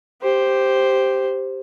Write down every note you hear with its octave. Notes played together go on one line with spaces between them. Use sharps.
G4 C5